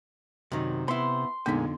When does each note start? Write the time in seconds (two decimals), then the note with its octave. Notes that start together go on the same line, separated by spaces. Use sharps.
0.52 F#2 C3 D#3
0.88 B3 E4 C6
1.46 F2 A#2 D3 G#3 B3 D#4